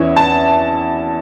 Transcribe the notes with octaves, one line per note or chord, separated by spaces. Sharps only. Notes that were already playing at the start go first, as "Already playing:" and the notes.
Already playing: E2 E3 C#4 E4
A5